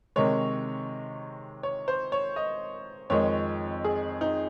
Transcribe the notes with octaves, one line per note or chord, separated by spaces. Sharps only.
C3 D#3 G#3 C#5
C#5
C5
C#5
D#5
F2 D#3 G#3 C#5
G#4
D#4